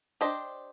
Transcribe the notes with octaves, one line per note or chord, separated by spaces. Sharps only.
D4 G4 C5 D#5